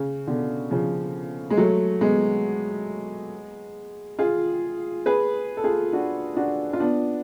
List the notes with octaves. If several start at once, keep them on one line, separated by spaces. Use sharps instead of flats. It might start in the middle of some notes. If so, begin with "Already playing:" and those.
Already playing: C#3
B2 D3
C#3 F3
G#3
F#3 A3
G#3 B3
F4 G#4
G#4 B4
A4
F4 G#4
D4 F#4
D4 F#4
F4
B3 D4